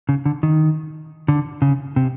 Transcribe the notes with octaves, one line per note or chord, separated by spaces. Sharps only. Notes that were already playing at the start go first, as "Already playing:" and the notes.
C#3
D3
D#3
D3
C#3
C3